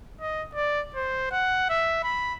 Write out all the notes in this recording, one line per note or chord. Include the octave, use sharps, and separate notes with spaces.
D#5
D5
C5
F#5
E5
B5